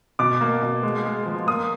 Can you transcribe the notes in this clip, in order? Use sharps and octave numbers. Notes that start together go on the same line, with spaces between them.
B2 D6
A#3
B2
G#3
G#3
F3
A#3 D#6